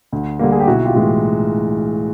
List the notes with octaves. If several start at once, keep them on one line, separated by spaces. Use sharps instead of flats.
D2
D3 G3 A#3
G#4
G4
B1 E4 F#4
F4 G4
A2 E3 G#3